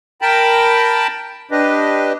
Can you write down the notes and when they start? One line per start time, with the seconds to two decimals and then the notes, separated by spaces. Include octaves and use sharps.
0.22 A#4 G5 A5 B5
1.51 D4 G4 B4 D#5